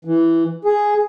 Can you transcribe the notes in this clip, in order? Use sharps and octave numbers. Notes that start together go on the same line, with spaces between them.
E3
G#4